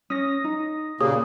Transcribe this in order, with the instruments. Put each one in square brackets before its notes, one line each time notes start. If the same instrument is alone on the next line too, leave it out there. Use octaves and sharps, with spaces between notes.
[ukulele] C#4 [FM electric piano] D#6 A#6
[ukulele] D#4
[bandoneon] A#2 C#3 A#3 [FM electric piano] G4 G#4 C#5 [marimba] D#6